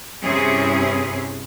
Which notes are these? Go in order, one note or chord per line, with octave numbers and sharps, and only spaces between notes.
G2 C3 C4 C#4 E4 G#4